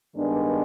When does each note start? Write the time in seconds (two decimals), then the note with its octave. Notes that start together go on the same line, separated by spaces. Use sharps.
0.16 G2 D#3 G#3 B3 D4